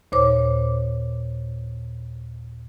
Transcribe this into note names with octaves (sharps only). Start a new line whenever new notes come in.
D#2 A#2 C5 C#5 D6